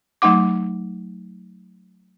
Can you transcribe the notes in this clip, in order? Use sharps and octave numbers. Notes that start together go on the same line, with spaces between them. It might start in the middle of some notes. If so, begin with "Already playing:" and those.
F#3 A3 D#4 F#5 D6